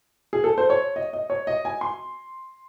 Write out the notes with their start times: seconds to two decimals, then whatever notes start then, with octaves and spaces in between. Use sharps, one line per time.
0.33 G#4
0.44 A4
0.58 C5
0.70 C#5
0.96 D#5
1.13 D#5
1.30 C#5
1.47 D#5
1.65 G#5
1.81 C6